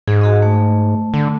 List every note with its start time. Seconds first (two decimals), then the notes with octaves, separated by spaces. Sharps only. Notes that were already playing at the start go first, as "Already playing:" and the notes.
0.08 G#2 G#4
0.21 F#4 G#4 D#5
0.42 A3
1.14 D3